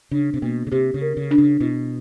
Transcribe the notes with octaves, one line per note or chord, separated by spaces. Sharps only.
C#3 D4
C3
B2 A#3
C#3
C3 G4
C#3
A#4
C#3
D4
C#3
B2 E4